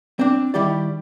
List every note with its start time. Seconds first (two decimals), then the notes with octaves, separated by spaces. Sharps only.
0.19 C4 D4
0.54 D#3 G3 E4 G4 D5